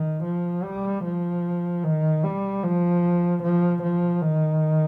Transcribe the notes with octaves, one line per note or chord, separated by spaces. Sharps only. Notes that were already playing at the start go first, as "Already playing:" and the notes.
Already playing: D#3
F3
G3
F3
D#3
G3
F3
F3
F3
D#3